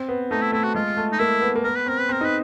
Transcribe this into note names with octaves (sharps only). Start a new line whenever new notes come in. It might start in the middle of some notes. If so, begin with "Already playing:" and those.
Already playing: C4
B3
A3 D#4
E4
A3 E4
F#4
G#3 F4
A3
D#4
A#3 E4
B3
A#3
B3 A#4
B4
C4 A#4
B4
C4 A#4
D#4 B4